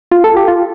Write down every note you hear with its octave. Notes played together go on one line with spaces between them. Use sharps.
F4
A4
G4
F4